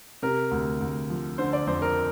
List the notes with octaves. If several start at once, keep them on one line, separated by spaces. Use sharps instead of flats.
C3 A#4
D2
D2
F3
D3 C5
D5
F2 C5
A#4